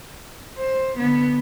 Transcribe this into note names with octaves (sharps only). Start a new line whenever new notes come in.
C5
D3 B3